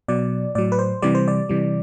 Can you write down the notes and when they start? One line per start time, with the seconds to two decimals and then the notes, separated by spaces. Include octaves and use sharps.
0.08 B2 F#3 D5
0.55 A2 F#3 D5
0.72 B4
0.79 C5
1.02 C3 E3 G3 D5
1.15 C5
1.28 D5
1.49 C3 E3 G3